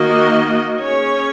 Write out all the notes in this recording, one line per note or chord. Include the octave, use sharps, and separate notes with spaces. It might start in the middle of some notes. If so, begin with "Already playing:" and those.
Already playing: D#3 A#3 F#4 D#5
C#4 G#4 C#5